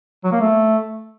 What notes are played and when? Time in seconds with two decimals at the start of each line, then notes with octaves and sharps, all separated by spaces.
0.24 F#3
0.32 A#3
0.40 A3